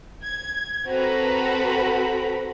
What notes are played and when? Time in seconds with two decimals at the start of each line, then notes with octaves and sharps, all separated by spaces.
0.23 G#6
0.87 C4 F#4 A4 B4 A#5 B5